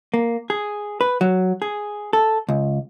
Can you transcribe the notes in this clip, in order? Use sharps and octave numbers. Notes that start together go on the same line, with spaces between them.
A#3
G#4
B4
F#3
G#4
A4
C#2